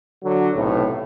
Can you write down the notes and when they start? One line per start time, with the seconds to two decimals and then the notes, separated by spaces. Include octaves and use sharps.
0.24 D3 F#3 F#4
0.55 B1 A2 C3